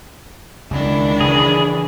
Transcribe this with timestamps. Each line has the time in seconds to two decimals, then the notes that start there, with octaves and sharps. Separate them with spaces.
0.71 C#2 D#3 D4 E4
1.21 C#3 E3 G#4